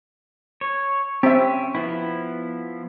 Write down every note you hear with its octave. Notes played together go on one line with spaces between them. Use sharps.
C#5
C4 C#4 G4 E5
F3 B3 E4